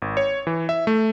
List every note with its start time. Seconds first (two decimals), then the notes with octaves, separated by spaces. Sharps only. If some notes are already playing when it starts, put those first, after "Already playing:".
0.02 G#1
0.17 C#5
0.47 E3
0.69 E5
0.87 A3